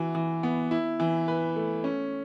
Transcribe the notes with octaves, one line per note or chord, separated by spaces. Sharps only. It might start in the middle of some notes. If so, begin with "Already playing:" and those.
Already playing: E3 F#4
E3
B3
E4
E3
B4
A3
C#4